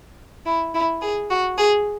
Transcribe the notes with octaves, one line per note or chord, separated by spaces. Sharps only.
E4
E4
G#4
F#4
G#4